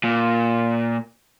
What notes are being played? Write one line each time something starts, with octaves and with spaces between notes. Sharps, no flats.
A#2